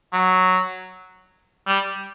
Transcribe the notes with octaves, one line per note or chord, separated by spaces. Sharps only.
F#3
G3